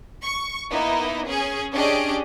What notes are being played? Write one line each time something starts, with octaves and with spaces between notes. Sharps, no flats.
C#6
A#3 B3 D#4 E4
C#4 G#4
C#4 D4 G4 G#4 D#5 D7